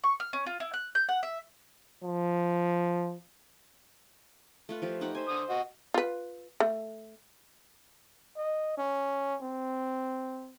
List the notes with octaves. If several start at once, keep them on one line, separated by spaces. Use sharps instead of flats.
C#6
F6
C#4
F4
E4
F#6
G6
F#5
E5
F3
A3 F4 B4
F3 F4 G4
D#4 G4 F#5
C5 E5 G#5
D3 D#6
F#4 D#5
F4 B4
A3
D#5
C#4
C4